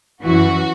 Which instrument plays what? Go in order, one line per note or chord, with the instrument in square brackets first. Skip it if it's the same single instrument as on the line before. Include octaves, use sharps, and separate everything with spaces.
[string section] F#2 E3 F#4